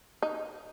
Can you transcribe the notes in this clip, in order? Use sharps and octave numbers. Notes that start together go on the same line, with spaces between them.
D#4